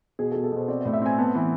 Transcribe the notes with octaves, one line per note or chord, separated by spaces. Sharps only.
B2 G#4
A4
B2
A4
B2 C5
C4 D5
A2 D5
E5
C4 G#5
B3 A5
E3